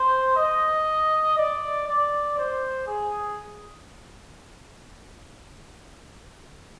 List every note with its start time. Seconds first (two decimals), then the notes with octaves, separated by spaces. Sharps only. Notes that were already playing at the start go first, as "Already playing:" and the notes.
Already playing: C5
0.36 D#5
1.37 D5
1.87 D5
2.37 C5
2.87 G#4